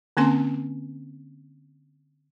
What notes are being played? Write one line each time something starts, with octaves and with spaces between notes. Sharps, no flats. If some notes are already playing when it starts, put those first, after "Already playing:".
D3 A#3 C4 C#4 G#5 C6